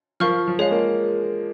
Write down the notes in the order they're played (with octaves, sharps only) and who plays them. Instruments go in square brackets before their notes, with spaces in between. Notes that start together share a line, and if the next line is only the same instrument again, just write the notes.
[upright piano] F3 [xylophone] A#4 F5 C#6 F6
[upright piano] F3
[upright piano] G#3 [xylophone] G#4 C#5 F5
[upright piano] A#3